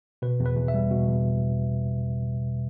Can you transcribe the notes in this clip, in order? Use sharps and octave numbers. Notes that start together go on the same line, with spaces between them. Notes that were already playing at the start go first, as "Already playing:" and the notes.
B2 B4
E2
B4
E2
E5
G3
B2
E2